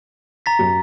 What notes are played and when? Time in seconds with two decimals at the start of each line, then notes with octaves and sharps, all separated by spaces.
0.46 A#5 A6 B6
0.59 F#2